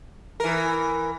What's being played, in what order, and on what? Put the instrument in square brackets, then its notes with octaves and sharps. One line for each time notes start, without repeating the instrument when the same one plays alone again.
[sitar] E3 A#4